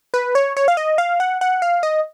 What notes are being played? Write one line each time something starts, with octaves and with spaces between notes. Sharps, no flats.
B4
C#5
C#5
F5
D#5
F5
F#5
F#5
F5
D#5